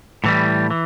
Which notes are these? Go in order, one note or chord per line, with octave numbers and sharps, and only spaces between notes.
A2 E3 G3
E3